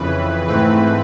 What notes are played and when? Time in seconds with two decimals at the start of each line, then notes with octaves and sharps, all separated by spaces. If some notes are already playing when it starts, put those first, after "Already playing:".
Already playing: F2 C#3 E3 B4
0.47 G#2 E3 A3 C4 B4